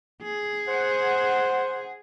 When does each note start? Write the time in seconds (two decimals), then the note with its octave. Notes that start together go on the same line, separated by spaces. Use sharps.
0.23 G#4
0.68 C5 F#5